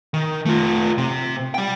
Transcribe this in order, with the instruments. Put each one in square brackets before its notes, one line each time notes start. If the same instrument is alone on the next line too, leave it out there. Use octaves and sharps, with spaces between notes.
[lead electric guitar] D#3
A3 F4
C3
G3 G5